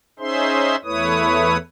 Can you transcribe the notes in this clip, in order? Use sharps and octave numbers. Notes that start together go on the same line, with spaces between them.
C#4 D#4 G#4 C5 E5 C6
E2 A3 E4 B4 C#5 D#6